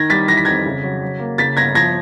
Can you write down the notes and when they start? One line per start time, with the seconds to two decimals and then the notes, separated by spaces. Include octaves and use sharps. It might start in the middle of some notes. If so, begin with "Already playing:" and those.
Already playing: D#3 G#6 A#6
0.10 G3 A6 B6
0.28 E3 A#6
0.37 B6
0.45 F2 G#6 A#6
0.66 C#3
0.84 F#3
1.01 F#3
1.20 A#3
1.38 C#3 A6 B6
1.57 G1 G#6 A#6
1.75 F3 G#6 A#6